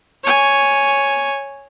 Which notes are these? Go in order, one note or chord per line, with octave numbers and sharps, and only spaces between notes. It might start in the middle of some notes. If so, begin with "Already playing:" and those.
C#5 G#5